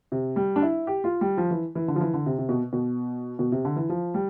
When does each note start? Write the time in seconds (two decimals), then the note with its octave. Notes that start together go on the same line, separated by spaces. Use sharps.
0.12 C3
0.36 G3
0.56 D4
0.62 E4
0.87 G4
1.04 F4
1.21 G3
1.38 F3
1.51 E3
1.75 E3
1.88 D3
1.96 F3
2.01 E3
2.14 D3
2.26 C3
2.39 C3
2.49 B2
2.73 B2
3.39 B2
3.52 C3
3.65 D3
3.76 E3
3.90 F3
4.14 G3